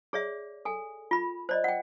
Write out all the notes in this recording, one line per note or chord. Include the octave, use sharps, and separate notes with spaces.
G#4 C#5 D5 E5
A4 G#5
F4 B5
C5 D5 D#5
F#5 G5